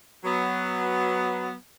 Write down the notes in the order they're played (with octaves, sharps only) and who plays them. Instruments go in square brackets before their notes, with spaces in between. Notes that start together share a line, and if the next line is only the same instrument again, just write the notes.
[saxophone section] F#3 B3